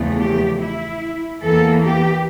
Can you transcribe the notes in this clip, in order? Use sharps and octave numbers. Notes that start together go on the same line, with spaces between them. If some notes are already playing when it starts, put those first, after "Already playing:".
Already playing: E2 C#3 F3 A3
G4
E4
E2 E3 A#3 A4
G4